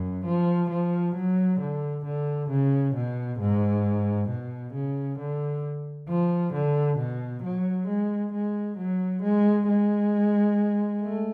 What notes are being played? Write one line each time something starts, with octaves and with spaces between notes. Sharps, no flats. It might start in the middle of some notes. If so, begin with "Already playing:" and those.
Already playing: F#2
F3
F3
F#3
D3
D3
C#3
B2
G#2
B2
C#3
D3
F3
D3
B2
F#3
G#3
G#3
F#3
G#3
G#3
A3